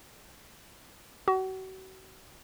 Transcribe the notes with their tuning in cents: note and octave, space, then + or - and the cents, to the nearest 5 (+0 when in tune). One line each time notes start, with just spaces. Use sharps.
F#4 +35